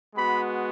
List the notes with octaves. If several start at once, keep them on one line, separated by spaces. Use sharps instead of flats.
G#3 B3 F#4 B5